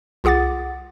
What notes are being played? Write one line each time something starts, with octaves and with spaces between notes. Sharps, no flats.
C2 F4 G#4 F#5 D6 A6